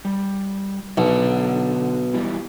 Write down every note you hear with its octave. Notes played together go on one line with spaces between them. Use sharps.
G3
B1 D3 F#5
B2 E3 G3